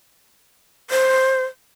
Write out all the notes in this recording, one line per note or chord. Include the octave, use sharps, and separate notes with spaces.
C5